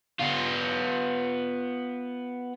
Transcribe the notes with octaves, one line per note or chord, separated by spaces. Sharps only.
B3 F4